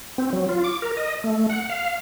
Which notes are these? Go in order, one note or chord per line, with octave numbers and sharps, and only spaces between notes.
C4
F#3
F4
D6
A#4
D#5
A3
F#5
F5